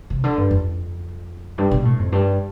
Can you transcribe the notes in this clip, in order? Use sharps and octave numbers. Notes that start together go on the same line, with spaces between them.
C3
D3
G2
F2
G2
B2
A2
F2
G2